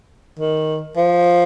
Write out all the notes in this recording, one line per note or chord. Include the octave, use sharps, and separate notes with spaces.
D#3
F3